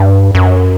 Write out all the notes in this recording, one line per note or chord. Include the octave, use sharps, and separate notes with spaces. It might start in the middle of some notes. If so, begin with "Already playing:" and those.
Already playing: G2
F#2